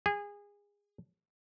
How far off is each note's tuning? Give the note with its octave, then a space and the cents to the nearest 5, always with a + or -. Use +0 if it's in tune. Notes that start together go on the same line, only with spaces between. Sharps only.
G#4 -25